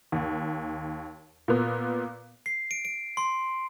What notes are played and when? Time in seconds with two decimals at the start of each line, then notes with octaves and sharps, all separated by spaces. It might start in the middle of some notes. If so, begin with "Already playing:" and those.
0.12 D#2
1.48 A#2 B3
2.46 C7
2.71 D7
2.85 D7
3.17 C6